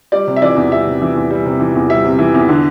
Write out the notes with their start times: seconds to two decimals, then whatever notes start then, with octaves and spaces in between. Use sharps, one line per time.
0.12 G3 D5
0.27 C3
0.36 E5
0.42 E3 D5
0.56 E2
0.71 G3 E5
0.86 C3
1.02 E3
1.16 E2
1.31 G3
1.46 C3
1.60 E3
1.75 E2
1.90 G3 E5
2.05 C3
2.19 E3
2.34 E2
2.49 D3